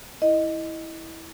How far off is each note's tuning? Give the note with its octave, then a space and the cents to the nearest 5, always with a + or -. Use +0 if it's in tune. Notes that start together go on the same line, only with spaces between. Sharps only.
E4 -10 D#5 +0